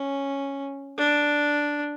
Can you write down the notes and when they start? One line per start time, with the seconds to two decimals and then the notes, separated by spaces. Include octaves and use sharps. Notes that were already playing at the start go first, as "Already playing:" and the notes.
Already playing: C#4
0.98 D4